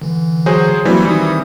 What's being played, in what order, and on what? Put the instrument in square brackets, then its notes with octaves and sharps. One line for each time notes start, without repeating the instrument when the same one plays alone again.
[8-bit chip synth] D3 E3
[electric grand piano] F#3 G#4 C5
[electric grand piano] E3 G3 C4 [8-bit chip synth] F#3 A#3 F#4
[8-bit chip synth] D#3 D#4 D#6